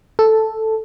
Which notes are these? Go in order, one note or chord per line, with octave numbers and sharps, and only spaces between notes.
A4